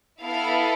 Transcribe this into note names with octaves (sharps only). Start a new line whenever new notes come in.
B3 E4 A4 F5